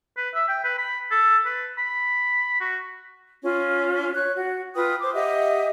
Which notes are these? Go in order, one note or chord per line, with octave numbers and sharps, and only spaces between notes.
B4
E5
G5
B4
B5
A4
B4
B5
F#4
C#4 F4
C#5 C#6 F#6
F#4
F4 B4 G5 D#6
C5 D6
G4 D#5 E5 F#5